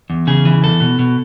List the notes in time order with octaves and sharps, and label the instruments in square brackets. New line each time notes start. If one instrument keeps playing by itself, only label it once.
[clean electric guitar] E2
C#3 G#4
E3
E2 A4
B2
B2